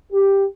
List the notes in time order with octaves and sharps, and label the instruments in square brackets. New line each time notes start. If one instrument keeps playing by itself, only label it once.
[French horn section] G4